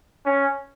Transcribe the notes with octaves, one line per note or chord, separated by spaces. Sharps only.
C#4